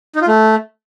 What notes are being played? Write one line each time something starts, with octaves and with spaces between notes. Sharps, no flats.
D#4
F4
A3